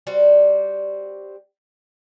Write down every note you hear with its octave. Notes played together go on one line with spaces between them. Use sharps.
G3 C4 F#4